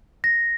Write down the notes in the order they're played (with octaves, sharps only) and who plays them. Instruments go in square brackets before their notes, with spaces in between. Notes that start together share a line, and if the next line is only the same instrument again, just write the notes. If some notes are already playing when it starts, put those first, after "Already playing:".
[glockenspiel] A#6